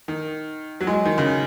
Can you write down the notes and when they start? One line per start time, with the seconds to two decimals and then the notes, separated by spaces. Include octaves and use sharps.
0.08 D#3
0.81 F#3
0.87 G#3
0.93 F#3
1.05 D#3
1.18 C#3